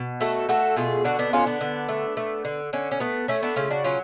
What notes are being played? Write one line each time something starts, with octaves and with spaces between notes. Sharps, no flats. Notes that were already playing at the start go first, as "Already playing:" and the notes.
Already playing: B2
A3 F#4 A4
A3 F#4 A4
B2 F4 G#4
D3 D4 F#4
B3 D4
D3 C#4 F4
B3 D4
D3
A3
A3
D3
D3 C#4
C#4
A3 B3
A3 C#4
B3 D4
C#3 C#4 F4
D4 F#4
F#3 C#4 F4